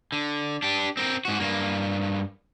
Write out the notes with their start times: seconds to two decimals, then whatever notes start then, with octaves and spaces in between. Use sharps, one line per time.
0.12 D3
0.62 D4 G4
0.97 C4 A#4
1.25 G#2 F#4
1.40 G2 A#3